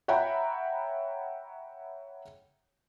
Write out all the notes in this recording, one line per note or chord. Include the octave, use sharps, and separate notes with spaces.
C#5 E5 F#5 G5 A#5 B5